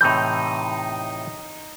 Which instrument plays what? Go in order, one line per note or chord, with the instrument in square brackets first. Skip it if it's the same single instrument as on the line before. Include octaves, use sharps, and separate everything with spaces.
[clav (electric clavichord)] A2 C3 E3 [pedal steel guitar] D#4 G6